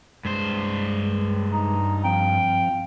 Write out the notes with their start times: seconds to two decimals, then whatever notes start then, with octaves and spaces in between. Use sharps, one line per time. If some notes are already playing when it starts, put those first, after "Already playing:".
0.25 G2 G#3 C5
1.53 D#4
2.04 F3 C4 F5 G5